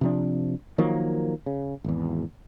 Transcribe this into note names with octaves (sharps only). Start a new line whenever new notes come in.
C3 F3 D4
D#3 F3 F#3 A#3
C#3
G#1 E2